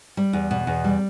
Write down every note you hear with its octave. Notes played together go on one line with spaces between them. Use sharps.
G3
E2
B2
E2
G3